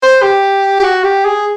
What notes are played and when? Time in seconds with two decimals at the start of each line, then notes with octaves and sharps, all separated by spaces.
0.02 C5
0.22 G4
0.80 G4
0.83 F#4
1.04 G4
1.25 G#4